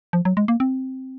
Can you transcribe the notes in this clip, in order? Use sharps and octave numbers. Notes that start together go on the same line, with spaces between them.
F3
F#3
G#3
A#3
C4